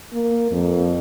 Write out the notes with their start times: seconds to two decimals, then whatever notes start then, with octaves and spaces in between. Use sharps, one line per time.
0.13 A#3
0.51 F2